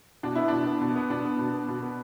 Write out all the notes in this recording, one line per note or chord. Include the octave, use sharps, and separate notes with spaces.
B2 D4
B3 E4
B2 D4
B3
B2
B3
B2 D4
B3
B2
B3
B2
B3